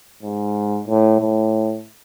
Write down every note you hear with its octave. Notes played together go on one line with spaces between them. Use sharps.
G#2
A2
A2